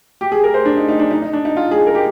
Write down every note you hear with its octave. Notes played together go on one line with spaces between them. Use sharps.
G4
G#4
A#4
C5
D4
D#4
D#4
D4
D#4
D#4
D4
D#4
F4
G#4
A#4
G4